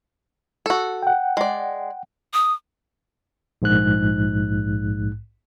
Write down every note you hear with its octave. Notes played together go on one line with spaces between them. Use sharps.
F#4 A4
F#5 G5
G#3 D5
D#6
A#1 G#2 F#6